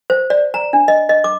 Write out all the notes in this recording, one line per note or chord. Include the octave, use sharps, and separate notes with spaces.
C5
D5
A#5
D4
D#5
D#5
D6